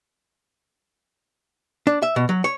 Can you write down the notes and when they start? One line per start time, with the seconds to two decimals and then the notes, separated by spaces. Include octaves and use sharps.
1.87 D4
2.02 E5
2.16 B2
2.29 F#3
2.44 C#5